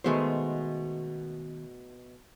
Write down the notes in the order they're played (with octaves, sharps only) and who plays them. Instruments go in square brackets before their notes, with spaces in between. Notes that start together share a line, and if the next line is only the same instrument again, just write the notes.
[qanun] B2 G#3 A3 [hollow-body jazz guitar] D#3 B3 C5